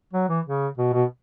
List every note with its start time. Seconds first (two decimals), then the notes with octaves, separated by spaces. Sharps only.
0.13 F#3
0.29 E3
0.46 C#3
0.78 B2
0.93 B2